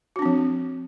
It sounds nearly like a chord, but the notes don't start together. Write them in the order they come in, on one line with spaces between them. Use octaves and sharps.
F#4 D4 C4 F3